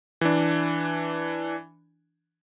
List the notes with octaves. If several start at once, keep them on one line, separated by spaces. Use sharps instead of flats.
E3 D4